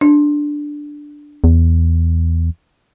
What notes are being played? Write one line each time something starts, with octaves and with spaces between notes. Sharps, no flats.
D4
E2